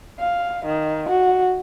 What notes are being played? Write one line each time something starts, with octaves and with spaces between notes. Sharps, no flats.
F5
D#3
F#4